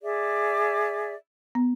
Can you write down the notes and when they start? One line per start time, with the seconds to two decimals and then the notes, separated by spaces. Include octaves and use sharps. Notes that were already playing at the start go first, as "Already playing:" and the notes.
0.03 G#4 D5 E5
1.55 B3